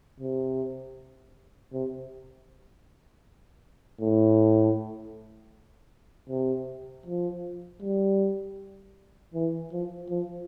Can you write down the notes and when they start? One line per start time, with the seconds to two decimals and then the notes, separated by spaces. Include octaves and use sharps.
0.20 C3
1.73 C3
4.01 A2
6.29 C3
7.06 F3
7.82 G3
9.34 E3
9.72 F3
10.10 F3